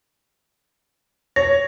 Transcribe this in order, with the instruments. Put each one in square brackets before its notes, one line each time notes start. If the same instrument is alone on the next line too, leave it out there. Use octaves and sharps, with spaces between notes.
[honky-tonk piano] C#5 [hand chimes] A#6